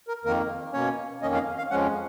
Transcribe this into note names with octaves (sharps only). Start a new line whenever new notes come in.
A#4
F2 D#3 A#3 A#4
B2 A#3 C#4 C#5
F2 D#3 A#3 C#4 D#5
F5
F5
F2 F3 G#3 C#4 F#5